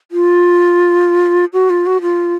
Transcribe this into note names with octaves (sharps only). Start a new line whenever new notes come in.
F4
F#4
F4
F#4
F4